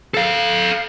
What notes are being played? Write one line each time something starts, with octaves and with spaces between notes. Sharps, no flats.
A4 F5